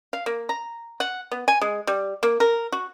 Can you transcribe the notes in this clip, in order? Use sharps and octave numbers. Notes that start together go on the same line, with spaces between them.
F5
A#3
A#5
F#5
B3
G#5
G#3
G3
A#3
A#4
F#4